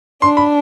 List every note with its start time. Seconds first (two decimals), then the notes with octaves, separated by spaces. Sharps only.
0.22 D4 C6
0.37 B5